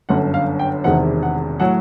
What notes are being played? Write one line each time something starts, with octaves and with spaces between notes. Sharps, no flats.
G1 F#2 D3 F#5
F5
G5
E1 E2 C3 D#3 F#5
F#5
A2 F#3 F#5